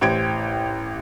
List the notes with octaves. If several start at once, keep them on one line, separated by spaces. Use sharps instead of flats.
A1 G4 C5 G#6 D7